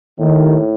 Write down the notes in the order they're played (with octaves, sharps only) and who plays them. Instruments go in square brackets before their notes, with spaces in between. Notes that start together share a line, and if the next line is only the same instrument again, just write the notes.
[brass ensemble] D#2 D#3 [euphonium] A2